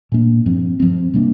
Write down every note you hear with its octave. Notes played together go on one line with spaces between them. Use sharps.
A#2 A#3 D4
G2 F3 C4
G2 F3 C4
C3 G3 A#3 D4